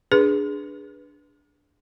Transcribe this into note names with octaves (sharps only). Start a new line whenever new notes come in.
D4 G#4 B4